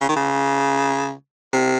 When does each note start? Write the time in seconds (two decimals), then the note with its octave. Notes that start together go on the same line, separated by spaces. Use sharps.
0.01 C#3
0.09 D#3
0.16 C#3
1.53 C3